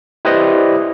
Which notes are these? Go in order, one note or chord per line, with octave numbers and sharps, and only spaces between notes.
E4 G4 B4 C5 D5 D#5